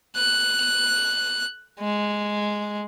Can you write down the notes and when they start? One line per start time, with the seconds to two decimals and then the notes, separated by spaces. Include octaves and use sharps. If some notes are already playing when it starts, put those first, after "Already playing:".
0.17 F#6
1.80 G#3